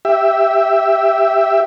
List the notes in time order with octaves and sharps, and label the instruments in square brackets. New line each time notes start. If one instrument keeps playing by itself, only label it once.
[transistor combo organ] G4 E5